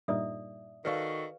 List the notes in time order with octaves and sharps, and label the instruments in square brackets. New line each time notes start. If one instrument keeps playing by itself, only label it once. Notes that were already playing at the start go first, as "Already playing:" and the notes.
[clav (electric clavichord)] G2 A#2 D#4 [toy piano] D5 E5 D#6
[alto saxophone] D#3 [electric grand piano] F#4 A4 C#6 [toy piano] B4 D5 F5